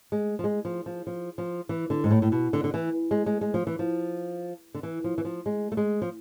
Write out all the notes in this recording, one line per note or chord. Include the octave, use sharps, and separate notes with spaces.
G#3
F3
G#3
F3
F3
F3
F3
E3
D3
G#2
A2
A2
B2
D3
D3
E3
G#3
G#3
G#3
F3
E3
F3
D3
E3
F3
E3
F3
G#3
A3
G#3
F3